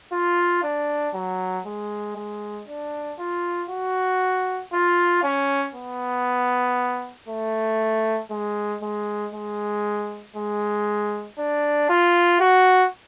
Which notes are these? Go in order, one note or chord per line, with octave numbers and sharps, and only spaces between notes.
F4
D4
F#3
G#3
G#3
D4
F4
F#4
F4
C#4
B3
A3
G#3
G#3
G#3
G#3
D4
F4
F#4